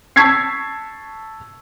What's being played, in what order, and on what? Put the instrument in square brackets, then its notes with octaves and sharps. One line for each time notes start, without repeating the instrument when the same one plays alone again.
[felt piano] A5 C#6 E6 G#6 B6 C7